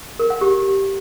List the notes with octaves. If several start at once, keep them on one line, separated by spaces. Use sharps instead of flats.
A#4
F#5
G4